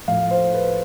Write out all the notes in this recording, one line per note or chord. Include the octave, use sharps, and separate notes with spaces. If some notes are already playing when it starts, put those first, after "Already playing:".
A2 F3 F5
C5
B4